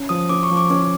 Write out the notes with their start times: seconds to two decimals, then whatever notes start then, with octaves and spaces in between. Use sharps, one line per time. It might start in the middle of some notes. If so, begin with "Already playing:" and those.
Already playing: C#4
0.09 F3 D#6
0.29 C#4 D6
0.43 C#6
0.50 F3
0.57 D6
0.70 C#4 D6